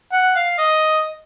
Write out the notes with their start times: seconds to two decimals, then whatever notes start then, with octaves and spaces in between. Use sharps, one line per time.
0.13 F#5
0.36 F5
0.58 D#5